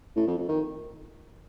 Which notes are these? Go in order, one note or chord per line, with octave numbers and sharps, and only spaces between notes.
A2
F2
F2
D#3